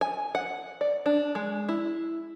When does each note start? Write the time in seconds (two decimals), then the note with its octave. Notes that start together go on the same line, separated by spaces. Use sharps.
0.01 G#5
0.35 F#5
0.81 D5
1.06 D4
1.35 G#3
1.69 E4